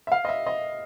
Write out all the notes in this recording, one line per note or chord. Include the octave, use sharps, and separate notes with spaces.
E5
F5
D#5
E5
D#5